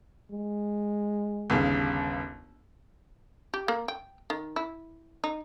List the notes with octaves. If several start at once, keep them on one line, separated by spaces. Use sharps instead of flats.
G#3
G1 D#2 C#3
G4
A#3
G5
D#3
E4
D#4